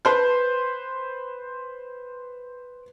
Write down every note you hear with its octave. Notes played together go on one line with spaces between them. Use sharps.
B4 C5 G6